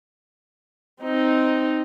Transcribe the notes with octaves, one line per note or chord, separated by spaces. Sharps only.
C4 D#4